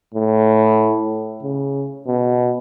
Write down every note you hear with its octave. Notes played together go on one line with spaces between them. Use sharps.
A2
C#3
B2